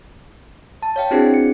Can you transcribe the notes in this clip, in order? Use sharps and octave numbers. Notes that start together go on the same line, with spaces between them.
A5
C#5 F5 G5
C4 D4 E4 F#4 G#4 C5
C#7